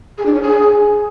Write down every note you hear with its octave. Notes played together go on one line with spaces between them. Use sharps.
G#4
D4
C#5
G#4